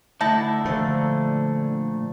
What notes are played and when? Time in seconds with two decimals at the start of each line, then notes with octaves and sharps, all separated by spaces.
0.21 D3 A3 D#4 E4 A4 A5
0.65 A#2 D3 F3 A3